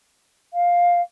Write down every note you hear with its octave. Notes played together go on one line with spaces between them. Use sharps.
F5